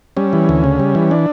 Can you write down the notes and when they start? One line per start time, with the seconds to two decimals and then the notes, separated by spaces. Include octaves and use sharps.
0.17 G3 C#4
0.33 E3
0.49 D2
0.64 C#3
0.80 G3
0.95 E3
1.11 D4